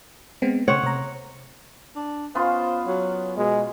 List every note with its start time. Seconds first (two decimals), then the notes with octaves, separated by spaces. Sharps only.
0.42 G#3 B3 C4
0.68 C#3 A3 C#4 C5 C#5 F#5
0.83 C3 A#5
1.96 D4
2.35 B3 C#4 F4 C5
2.87 F#3
3.37 B2 G#3